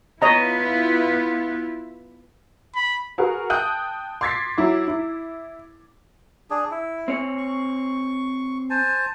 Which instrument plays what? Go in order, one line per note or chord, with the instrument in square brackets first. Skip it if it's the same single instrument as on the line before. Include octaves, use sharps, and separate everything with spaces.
[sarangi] B3 [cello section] E4 F4 B4 [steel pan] C#5 D#5 A#5
[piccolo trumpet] B5
[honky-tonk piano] F#4 G#4 A#4 B4
G5 A5 D#6 F#6 G6 D#7
C6 D6 G#6 A6 B6 C7
F#3 E4 D6
E4
[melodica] D4 G#4
E4
[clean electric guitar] C4 C#5
[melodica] C#6
C5 G#5 A5